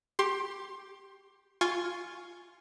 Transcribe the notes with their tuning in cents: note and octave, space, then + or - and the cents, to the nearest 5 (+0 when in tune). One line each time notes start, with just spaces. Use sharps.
G4 +0 C6 +25
F4 +0 G#5 +0 C#6 +0